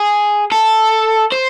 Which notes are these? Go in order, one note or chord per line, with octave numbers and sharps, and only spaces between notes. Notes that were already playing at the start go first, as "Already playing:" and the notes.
Already playing: G#4
A4
C5